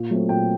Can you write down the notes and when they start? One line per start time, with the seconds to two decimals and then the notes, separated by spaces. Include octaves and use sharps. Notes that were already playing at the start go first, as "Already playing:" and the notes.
Already playing: A#2
0.11 F#3 A3 C4
0.29 A#2 G5